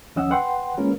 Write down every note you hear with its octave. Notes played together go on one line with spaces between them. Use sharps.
D#2 F3 C#4 D#5 F#5 E6
B4 F#5 G5 C6
G#3 A#3 C#4 F4 A#4 B4